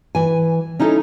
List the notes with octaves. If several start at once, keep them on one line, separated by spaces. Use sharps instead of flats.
E3 G#5
C#4 D#4 E4 A4